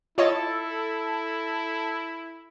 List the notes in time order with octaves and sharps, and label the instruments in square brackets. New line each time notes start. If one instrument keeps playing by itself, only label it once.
[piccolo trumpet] E4 [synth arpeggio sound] F4 C#5 D#5 [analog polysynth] A4